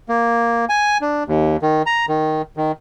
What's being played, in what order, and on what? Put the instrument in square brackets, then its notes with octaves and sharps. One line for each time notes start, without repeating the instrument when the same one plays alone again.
[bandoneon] A#3
G#5
D4
D#2
D#3
A#5
D#3
D#3